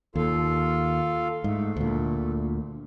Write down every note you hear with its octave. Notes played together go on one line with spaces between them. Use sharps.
D#2 F4 A4 F5
G#2 A3
D2 A#2